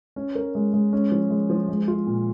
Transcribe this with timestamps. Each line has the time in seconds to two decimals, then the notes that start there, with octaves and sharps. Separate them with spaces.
0.16 C#4
0.35 A#4
0.55 G#3
0.74 G#3
0.93 C#4
1.12 F3
1.30 G#3
1.50 F3
1.69 G#3
1.88 F4
2.07 A#2